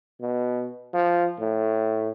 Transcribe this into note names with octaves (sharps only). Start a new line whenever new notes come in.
B2
F3
A2